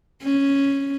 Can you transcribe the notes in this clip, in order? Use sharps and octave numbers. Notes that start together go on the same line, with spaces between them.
C#4